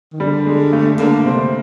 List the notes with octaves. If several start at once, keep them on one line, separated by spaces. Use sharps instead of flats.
D#3
D3 G3
G#3
A3
D3 A#3
C3 C4